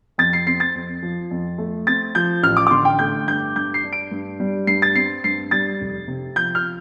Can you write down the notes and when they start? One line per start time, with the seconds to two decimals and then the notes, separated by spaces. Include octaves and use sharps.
0.18 F2 A6
0.33 C7
0.47 C4 C7
0.60 A6
0.75 F2
1.03 F3
1.31 F2
1.58 A3
1.87 C4 A6
2.15 F3 G6
2.43 A1 F6
2.57 D6
2.67 D6
2.71 D3 C6
2.85 G5
2.99 A3 G6
3.27 G2 G6
3.56 G2 G6
3.74 C7
3.84 D4
3.93 D7
4.11 G2
4.40 G3
4.67 G2 C7
4.82 A6
4.95 C4 C7
5.24 G2 C7
5.51 G3 A6
5.80 F1
6.08 C3
6.36 F3 G6
6.55 F6